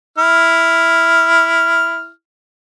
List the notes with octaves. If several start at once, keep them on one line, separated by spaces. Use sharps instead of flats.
E4 F6